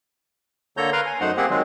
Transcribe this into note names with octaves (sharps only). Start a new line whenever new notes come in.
D3 A#3 A4 C#5 A#5 G6
A#4 B4 F5 A#5 C6
G#5
F#2 A3 D#4 C5 F#5
A#3 C4 G4 G#4 F#5
D#3 F#3 G#3 C4